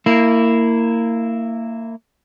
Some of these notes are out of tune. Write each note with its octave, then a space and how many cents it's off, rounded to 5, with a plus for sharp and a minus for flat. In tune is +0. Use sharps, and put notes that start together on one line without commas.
A#3 -25 E4 +0